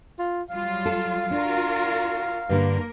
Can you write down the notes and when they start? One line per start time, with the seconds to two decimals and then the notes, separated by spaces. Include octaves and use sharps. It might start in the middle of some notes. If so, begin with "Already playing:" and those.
0.19 F4
0.50 F#3 G3 F4 F5
0.86 A4
1.31 D4 F4 F#4 A#4
2.49 G2 D3 A#3 A#4